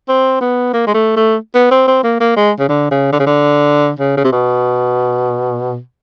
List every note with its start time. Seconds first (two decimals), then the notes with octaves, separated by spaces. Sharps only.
0.09 C4
0.41 B3
0.73 A#3
0.87 G#3
0.94 A3
1.16 A3
1.55 B3
1.71 C4
1.87 C4
2.04 A#3
2.20 A#3
2.36 G#3
2.59 C#3
2.69 D3
2.91 C#3
3.12 D3
3.20 C#3
3.26 D3
3.99 C#3
4.17 C#3
4.24 C3
4.32 B2